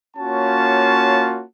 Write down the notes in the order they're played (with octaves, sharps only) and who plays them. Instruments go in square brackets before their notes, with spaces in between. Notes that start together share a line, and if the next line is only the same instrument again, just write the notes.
[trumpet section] A#3 C#4 F4 F#4 C#5 A5